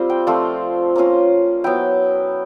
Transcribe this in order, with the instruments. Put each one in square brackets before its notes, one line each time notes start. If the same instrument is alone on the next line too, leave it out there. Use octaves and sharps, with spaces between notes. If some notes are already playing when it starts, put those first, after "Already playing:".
Already playing: [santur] G3 C4 F4
G5
F3 A3 C4 F4 D5
A#3 C#4 F4
F#3 B3 E4 G5